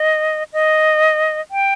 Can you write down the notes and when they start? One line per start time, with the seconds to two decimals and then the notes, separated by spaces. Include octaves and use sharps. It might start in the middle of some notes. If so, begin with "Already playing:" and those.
Already playing: D#5
0.53 D#5
1.51 G5